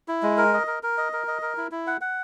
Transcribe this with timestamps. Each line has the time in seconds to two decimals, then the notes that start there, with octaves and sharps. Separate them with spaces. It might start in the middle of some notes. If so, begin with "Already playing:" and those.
0.08 E4
0.23 G#3
0.38 A#4
0.54 D#5
0.67 A#4
0.83 A#4
0.98 D#5
1.13 A#4
1.28 D#5
1.42 A#4
1.57 E4
1.72 E4
1.87 F#5
2.01 F#5